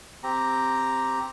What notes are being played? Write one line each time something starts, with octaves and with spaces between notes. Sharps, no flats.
C4 G4 A#5